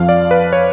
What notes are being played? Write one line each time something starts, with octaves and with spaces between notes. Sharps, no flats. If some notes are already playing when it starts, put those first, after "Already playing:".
Already playing: F2 F3 F5
D5
B4
C#5